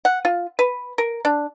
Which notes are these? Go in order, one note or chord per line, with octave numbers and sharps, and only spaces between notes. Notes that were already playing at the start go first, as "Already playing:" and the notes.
F#5
F4
B4
A#4
D4